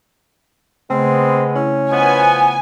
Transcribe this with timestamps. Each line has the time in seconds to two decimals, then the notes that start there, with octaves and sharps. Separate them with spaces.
0.90 C#3 G#3 A3 B3 C4
1.56 C#4 E4
1.91 F3 B3 D#5 G#5